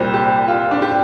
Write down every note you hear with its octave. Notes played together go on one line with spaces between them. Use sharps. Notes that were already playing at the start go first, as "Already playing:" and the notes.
Already playing: C2 A#2 G3 C5
G4
F4
D4
G4